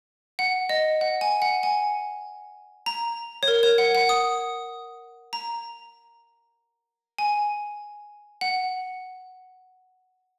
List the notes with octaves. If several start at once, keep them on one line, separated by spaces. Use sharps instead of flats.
F#5
D#5
F#5
G#5
F#5
G#5
A#5
C#5
A#4
C#5
F#5
F#5
D#6
A#5
G#5
F#5